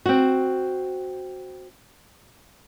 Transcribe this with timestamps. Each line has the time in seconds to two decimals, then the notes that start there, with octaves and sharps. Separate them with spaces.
0.06 C4 F#4